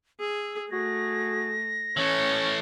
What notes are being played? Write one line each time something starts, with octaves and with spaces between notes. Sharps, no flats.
G#4 E6
A3 F#4 G#4 A#6
E3 A3 C#4 C#5